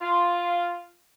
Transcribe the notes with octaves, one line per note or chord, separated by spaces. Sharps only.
F4